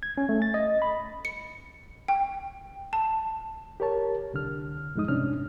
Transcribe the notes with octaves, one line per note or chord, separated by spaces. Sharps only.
G#6
C#4
A3
A6
D#5
B5
C#7
G5
A5
G4 A#4 C#5 A5
C2 D3 F6
F2 A2 G#3 D#4 D#6
C2 G2 C3 C#4 D4 F6